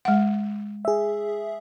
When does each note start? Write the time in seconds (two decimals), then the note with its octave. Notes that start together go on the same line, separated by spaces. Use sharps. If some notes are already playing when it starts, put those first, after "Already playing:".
0.05 G#3 F#5
0.85 G#4 E5